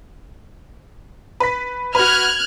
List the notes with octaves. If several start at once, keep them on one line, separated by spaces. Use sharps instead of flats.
B4 B6
F#4 B4 F6 F#6 G#6